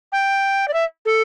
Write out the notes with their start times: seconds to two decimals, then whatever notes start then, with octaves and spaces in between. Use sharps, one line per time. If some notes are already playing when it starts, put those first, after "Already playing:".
0.12 G5
0.68 D5
0.73 E5
1.05 A4